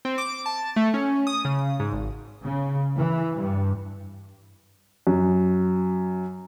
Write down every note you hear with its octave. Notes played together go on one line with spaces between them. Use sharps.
C4
D6
A5
A3
C#4
D#6
C#3
G#2
G#1
C#3
E3
G2
F#2